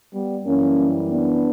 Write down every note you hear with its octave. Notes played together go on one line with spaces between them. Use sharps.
G3 B3
F#2 E3 G3 A#3 C#4
B3 D4